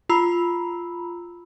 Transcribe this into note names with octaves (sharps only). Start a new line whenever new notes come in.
F4 A#5 B5 E6